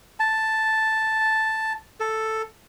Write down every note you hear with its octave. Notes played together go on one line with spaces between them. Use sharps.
A5
A4